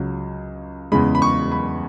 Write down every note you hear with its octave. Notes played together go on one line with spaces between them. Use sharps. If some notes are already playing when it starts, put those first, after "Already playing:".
Already playing: C#2 C#3 F#3
E2 C#3 G#3 B5
B5
C#6
B5